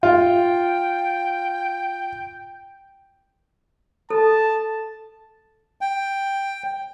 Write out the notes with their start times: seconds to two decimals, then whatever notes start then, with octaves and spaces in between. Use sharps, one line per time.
0.03 F4 G5
4.10 A4 A5
5.81 G5